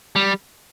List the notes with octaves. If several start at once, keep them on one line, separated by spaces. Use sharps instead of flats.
G3